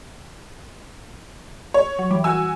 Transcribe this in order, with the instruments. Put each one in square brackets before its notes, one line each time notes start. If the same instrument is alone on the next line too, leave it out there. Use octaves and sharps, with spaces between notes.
[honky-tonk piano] C#5
[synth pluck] F#3
E3 G3
[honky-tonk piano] F#4 G#5 E6